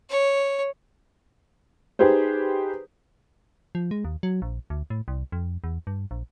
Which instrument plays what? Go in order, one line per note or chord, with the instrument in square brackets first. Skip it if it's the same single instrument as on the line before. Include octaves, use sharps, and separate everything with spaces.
[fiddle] C#5
[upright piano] D#4 G4 G#4 B4 C5
[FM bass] F3
G#3
D#2
F#3
A#1
D2
A2
C2
F2
E2
G2
A#1